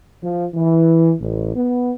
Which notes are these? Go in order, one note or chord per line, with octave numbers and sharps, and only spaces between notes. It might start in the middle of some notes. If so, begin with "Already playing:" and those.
F3
E3
A1
B3